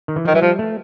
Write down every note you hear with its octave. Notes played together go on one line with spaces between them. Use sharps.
D#3
E3
D#3 F3
E3 F#3
F3 G3
A3